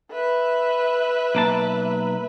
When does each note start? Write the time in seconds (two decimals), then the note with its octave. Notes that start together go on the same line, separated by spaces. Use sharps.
0.11 B4 E5
1.35 B1 A#3 A5